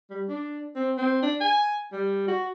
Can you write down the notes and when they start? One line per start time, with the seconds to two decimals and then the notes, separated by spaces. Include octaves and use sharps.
0.10 G3
0.29 D4
0.76 C4
0.98 C4
1.23 D4
1.41 G#5
1.92 G3
2.28 F#4